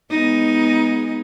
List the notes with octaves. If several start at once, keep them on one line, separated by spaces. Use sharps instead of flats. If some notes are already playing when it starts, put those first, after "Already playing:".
G#3 B3 D#4